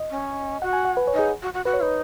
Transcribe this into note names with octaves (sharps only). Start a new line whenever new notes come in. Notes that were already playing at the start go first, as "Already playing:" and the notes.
Already playing: D#5
C#4
F#4 F#5
G#5
F#5
B4
C#5
D#4
G#4
F#4
F#4
F#4 B4
C#5
D#4 B4